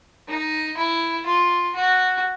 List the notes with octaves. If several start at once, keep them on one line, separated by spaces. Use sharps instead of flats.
D#4
E4
F4
F#4